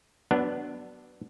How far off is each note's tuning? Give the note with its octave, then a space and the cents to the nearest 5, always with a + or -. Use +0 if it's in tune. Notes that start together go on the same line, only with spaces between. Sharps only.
F#3 +30 B3 +0 D4 +0